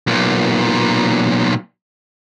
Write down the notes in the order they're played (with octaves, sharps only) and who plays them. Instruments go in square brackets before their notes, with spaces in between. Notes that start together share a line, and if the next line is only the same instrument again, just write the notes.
[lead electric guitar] B1 A#2